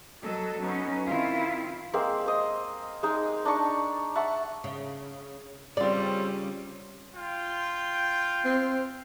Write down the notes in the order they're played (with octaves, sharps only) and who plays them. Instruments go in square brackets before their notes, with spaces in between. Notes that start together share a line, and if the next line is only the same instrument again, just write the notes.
[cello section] F#3 A4 D#5
F#3 B3 C#4 D#4
D#3 C4 E4 F4
[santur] G#3 A#3 C4
C5 D#5
G#3 D#4
D4 D#4 A5 C#6
E5 F#5 A5 C#6
[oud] C#3
[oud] C#3 [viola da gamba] G3 C#4 [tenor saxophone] C4 [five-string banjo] F4 D5
[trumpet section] F4 G5
[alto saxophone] C4